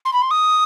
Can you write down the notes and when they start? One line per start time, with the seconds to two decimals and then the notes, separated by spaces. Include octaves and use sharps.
0.05 C6
0.13 B5
0.22 C6
0.31 D#6